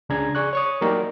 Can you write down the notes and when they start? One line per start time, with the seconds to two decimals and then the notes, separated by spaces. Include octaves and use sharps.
0.09 C#2 C#3 D4 G#4 A#5 G#6
0.35 G#4 D5 C#6 F#6
0.53 C#5 C#6 D#6
0.81 F#3 A#3 D#4 G4 A#4 D5